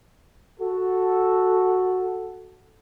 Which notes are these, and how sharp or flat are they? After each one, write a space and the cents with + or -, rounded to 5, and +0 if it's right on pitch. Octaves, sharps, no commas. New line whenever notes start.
F#4 +0 A4 +0